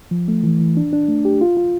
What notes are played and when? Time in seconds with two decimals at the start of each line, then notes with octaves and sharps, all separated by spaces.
0.11 F3
0.28 A3
0.43 E3
0.60 E3
0.77 D4
0.93 D4
1.09 A3
1.25 G4
1.41 F4
1.57 F4